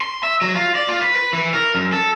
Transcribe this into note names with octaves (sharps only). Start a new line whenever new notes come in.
C6
E5
F#3
F4
D5
F4
B4
B4
E3
A#4
F#2
A4